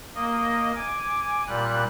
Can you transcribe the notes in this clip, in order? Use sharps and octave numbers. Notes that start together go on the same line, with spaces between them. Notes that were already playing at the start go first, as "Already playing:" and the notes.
A#3 D#5
G#5 D6
A#2 G3 F#6